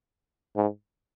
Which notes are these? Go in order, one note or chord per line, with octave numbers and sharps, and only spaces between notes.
G#2